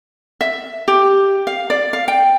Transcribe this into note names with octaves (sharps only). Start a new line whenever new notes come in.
E5
G4
F5
D5
F5
G5